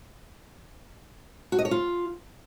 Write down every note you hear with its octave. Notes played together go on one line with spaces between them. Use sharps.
F#4
D#5
C#5
F4